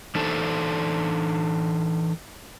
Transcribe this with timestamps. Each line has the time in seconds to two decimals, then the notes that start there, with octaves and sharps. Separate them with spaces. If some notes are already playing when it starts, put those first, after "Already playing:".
0.15 E3 D4 D#4 A4 C5